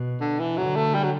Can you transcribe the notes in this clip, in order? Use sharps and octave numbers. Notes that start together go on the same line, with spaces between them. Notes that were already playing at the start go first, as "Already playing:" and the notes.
Already playing: B2
D3
E3
D3 F#3
A3
G3
F#3